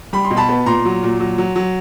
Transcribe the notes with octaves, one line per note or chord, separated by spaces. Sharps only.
G3 B5
C6
B2
A5 B5
B3
A#2 A#5 C6
F#3
A#2
F#3
F#3
F#3